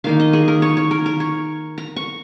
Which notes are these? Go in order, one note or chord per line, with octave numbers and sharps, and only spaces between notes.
D#3 A#3 D#4 F5
D#5
G#4
A#4
C#5
C#5
A#4
A#4
C#5
A#5
C#6